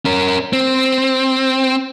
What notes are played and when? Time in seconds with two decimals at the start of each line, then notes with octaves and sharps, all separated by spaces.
0.06 C#4 A#4
0.53 C4